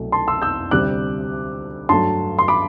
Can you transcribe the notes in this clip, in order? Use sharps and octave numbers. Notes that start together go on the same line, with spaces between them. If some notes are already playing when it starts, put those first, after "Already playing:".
Already playing: C2 B2 F#3 A3
A5 C6
C6 E6
E6 G6
D2 C3 G3 D6 F#6
G2 F#3 A3 A5 C6
C6
B5 D6